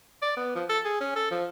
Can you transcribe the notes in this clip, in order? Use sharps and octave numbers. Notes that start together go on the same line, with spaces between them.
D5
B3
F3
A4
G#4
C#4
A4
F3